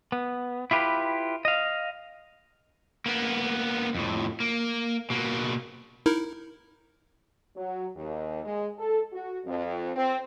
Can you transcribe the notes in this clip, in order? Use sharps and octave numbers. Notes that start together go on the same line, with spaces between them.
B3
E4 F4 G4 B4
D#5 F5
A#3 B3
F2 A2
A#3
B2 A#3
D#4 E4 A#4
F#3
D#2
G#3
A4
F#4
F2
C4